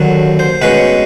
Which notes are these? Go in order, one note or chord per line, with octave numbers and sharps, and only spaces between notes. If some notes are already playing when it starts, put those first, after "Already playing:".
Already playing: D#2 D3 F#3
C5
B2 G#3 C#4 B4